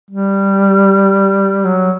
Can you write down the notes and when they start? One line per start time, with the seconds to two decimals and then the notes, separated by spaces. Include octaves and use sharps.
0.11 G3
1.65 F#3